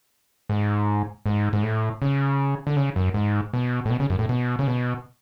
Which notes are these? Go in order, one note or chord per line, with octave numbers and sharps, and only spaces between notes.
G#2
G#2
G#2
A2
C#3
D3
C#3
F#2
G#2
B2
A2
B2
C#3
F#2
A2
B2
C#3
B2